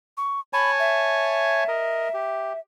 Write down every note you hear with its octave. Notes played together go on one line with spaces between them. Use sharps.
C#6
C#5 G#5 A5 B5
E5
A#4 D#5
G4